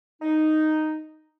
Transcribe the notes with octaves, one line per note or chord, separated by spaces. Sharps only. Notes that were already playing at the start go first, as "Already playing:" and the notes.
D#4